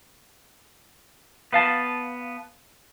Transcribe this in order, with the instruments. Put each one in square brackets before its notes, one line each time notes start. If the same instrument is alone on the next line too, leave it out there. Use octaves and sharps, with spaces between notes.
[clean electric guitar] B3 F5 A5